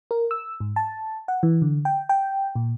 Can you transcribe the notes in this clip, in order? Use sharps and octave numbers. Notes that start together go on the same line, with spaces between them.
A#4
E6
G#2
A5
F#5
E3
D3
G5
G5
A#2